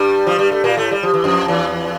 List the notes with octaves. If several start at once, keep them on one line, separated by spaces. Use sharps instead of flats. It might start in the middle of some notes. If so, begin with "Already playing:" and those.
Already playing: G2 G3
F3
G3
A3
A#2 A#3
A2 A3
G3
F3
E3
F2 F3
E2 E3